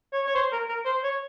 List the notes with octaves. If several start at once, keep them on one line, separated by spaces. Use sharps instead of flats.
C#5
C#5
C5
A#4
A#4
C5
C#5